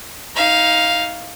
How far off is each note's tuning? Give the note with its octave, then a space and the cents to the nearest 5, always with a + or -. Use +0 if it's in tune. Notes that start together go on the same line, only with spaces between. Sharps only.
D#4 +25 F5 +0